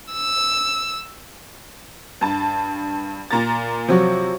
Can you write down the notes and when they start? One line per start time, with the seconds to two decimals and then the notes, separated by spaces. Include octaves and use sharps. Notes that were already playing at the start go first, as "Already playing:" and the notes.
0.13 E6
2.21 G2 A5
3.31 A#2 A#5 A6
3.88 C3 F3 F#3 F#4